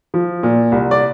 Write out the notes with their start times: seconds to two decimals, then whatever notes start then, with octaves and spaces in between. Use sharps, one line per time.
0.14 F3
0.43 A#2
0.72 C2
0.91 D5